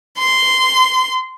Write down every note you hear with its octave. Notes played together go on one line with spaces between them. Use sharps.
C6